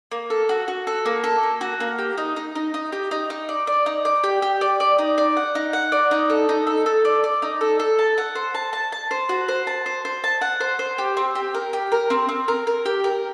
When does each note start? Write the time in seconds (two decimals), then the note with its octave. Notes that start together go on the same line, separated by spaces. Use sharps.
0.12 A#3
0.30 A4
0.49 F#4
0.68 F#4
0.87 A4
1.06 A#3
1.24 A4
1.43 A#3
1.61 F#4
1.80 A#3
1.98 G4
2.18 D#4
2.36 D#4
2.55 D#4
2.74 D#4
2.92 G4
3.11 D#4
3.30 D#4
3.49 D5
3.67 D5
3.86 D#4
4.05 D5
4.24 G4
4.42 G4
4.61 D5
4.80 D5
4.98 D#4
5.18 D5
5.37 F#5
5.55 D#4
5.73 F#5
5.92 D5
6.11 D#4
6.30 A4
6.49 D#4
6.67 A4
6.86 A4
7.05 D5
7.24 D5
7.42 D#4
7.61 A4
7.80 A4
7.99 A5
8.18 F#5
8.35 C5
8.55 A5
8.73 A5
8.92 A5
9.11 C5
9.29 F#4
9.48 C5
9.67 A5
9.86 C5
10.05 C5
10.24 A5
10.41 F#5
10.60 C5
10.79 C5
10.98 G4
11.17 C4
11.35 G4
11.54 A#4
11.73 G4
11.92 A#4
12.10 C4
12.29 C4
12.48 A#4
12.67 A#4
12.86 G4
13.04 A#4